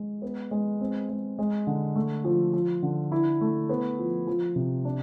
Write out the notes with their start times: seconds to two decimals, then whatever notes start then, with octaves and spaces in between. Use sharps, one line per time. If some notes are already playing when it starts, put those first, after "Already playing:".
Already playing: G#3
0.22 B3
0.51 G#3
0.80 C4
1.09 G#3
1.39 G#3
1.67 D3
1.96 A3
2.24 F3
2.53 F3
2.83 D3
3.12 E4
3.41 A3
3.69 B3
3.99 F3
4.27 F3
4.56 C3
4.85 D4